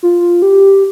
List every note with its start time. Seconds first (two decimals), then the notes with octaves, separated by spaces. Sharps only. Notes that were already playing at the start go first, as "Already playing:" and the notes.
0.03 F4
0.42 G4